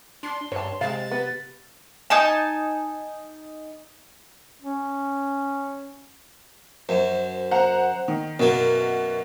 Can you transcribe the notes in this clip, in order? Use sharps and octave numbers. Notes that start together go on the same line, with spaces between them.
D4 C6
G2 C#5 A5
C3 G#3 F5 A6
B3
D#4 G#5 A5
C#4
F#2 C5
C5 F#5 A#5
D#3
F#2 B2 A#3